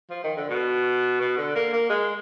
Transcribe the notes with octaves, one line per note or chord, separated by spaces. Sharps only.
F3
D#3
D3
B2
B2
D3
A#3
A#3
G#3